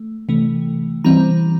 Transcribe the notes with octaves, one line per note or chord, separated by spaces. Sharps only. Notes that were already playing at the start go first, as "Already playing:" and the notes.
Already playing: A3
C3 E3 A3
E3 G3 C4 A#5